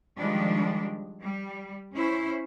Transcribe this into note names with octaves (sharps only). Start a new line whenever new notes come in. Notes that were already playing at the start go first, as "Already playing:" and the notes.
D#3 F3 G3 G#3 D4
G3
C#4 E4 C5